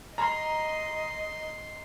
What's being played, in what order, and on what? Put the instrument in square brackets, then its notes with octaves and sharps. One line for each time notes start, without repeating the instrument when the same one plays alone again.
[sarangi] D#5 [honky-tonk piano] A#5 [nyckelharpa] C6